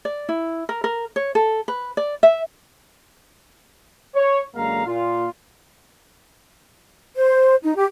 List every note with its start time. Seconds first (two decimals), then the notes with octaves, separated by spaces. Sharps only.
0.05 D5
0.29 E4
0.69 A#4
0.84 A#4
1.16 C#5
1.35 A4
1.68 B4
1.97 D5
2.23 E5
4.14 C#5
4.55 F#2 D3 G#3 A#3 F5 A#5
4.85 A#2 F4
7.16 C5
7.63 D#4
7.77 G4